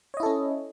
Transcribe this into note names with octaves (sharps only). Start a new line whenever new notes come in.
C#4 E4 A4 C#5 D#5